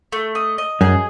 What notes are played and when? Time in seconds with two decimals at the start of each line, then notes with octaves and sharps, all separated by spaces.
0.12 A3
0.35 D#5
0.58 D#5
0.81 F#2 G#4